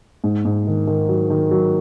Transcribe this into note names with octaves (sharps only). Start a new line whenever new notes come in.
G#2
G#2
D#3
D#3
F#3
D#3
F#3